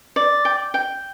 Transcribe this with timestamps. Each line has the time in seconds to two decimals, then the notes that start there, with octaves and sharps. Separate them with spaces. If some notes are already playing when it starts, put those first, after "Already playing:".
0.16 D5
0.45 G5
0.74 G5